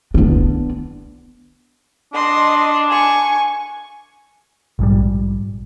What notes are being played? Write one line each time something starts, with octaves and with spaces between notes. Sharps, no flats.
B3 D4
D4 D#5 C6
G#5 C#6
A#1 G#2 G3